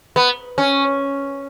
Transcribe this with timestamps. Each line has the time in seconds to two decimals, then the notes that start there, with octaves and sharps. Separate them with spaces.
0.16 B3
0.58 C#4